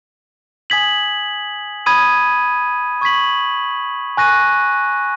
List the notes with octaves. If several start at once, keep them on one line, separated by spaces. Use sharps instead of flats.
G#5 D#6 G#6 B6 F#7
B5 D#6 G#6 D#7
C#6 G#6 B6 F#7
G#5 C#6 F#6 A#6 D#7